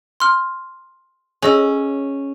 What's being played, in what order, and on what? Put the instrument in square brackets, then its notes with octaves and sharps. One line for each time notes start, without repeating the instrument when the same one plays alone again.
[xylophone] C6 F6
[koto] C#4 [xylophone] G#4 D#5 E6